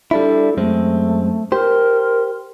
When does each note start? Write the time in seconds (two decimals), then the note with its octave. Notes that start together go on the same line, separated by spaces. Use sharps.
0.11 G3 D4 E4 A4
0.57 F#2 G#3 A3 C4
1.52 G4 A#4 C5